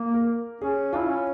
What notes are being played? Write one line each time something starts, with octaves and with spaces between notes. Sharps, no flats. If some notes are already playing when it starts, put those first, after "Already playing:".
Already playing: A#3
A#4
C#4 G#4
E4 F4
C#4